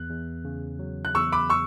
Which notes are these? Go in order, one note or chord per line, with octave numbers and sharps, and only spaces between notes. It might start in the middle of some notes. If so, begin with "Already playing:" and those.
Already playing: E2 F#6
E2
C#3
F#3
F#6
E2 C#6 E6
B5 D6
C#6 E6